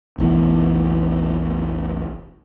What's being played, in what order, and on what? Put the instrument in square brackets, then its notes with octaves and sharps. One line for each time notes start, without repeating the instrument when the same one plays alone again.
[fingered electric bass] F1 B1 E3 B3